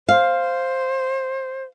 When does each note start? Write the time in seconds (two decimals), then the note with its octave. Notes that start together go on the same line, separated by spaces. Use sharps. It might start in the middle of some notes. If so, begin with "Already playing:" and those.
0.09 C5 F5